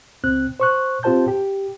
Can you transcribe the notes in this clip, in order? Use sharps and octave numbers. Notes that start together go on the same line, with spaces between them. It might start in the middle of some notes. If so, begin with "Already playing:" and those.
C#2 C4 F#6
C5 C#6 F#6
C4 F4 G4 C5 A5 G6
G4